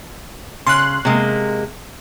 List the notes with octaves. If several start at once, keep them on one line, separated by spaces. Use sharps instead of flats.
C#3 C6 F#6
C3 G#3 A#3